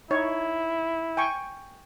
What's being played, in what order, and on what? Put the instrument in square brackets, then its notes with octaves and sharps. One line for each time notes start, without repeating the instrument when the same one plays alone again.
[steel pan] D#4 C#5 [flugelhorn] E4
[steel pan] G5 G#5 C#6